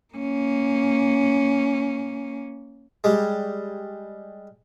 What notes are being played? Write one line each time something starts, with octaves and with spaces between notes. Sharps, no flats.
A#3 C#4
G3 G#3